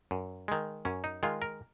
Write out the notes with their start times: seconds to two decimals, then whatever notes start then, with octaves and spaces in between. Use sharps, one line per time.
0.11 F#2
0.48 D#3 G#3
0.85 F#2 C#4
1.04 D#4
1.23 D#3 G#3 F4
1.42 A#4